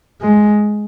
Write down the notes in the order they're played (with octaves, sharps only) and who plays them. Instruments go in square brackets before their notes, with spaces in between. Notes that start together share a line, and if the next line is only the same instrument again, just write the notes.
[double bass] G#3